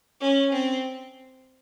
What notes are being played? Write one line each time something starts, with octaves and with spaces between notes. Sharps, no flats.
C#4
C4